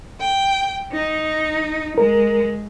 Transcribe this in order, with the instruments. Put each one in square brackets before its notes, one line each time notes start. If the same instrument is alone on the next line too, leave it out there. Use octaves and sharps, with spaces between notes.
[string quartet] G5
D#4
[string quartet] G#3 [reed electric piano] A#4